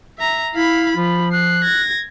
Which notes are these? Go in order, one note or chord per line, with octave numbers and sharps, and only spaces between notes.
E5 A#5
E4 F5 B5
F3 F4 B5
F#6 C7
G#6 A#6